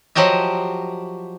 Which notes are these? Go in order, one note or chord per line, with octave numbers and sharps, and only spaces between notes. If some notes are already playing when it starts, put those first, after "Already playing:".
F3 F#3 G4 D#5 E5